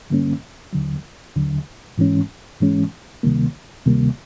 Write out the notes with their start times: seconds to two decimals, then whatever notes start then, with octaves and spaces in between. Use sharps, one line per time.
0.10 G2 D3 G3 A#3 C#4
0.73 D#2 D3 F#3
1.35 D#2 D3 F#3
1.98 G#2 E3 G#3 C#4
2.61 G#2 E3 G#3 C#4
3.23 D2 C3 D#3 G3 A#3
3.86 D2 C3 D#3 G3 A#3